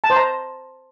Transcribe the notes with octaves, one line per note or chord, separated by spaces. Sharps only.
A5
C5
A#5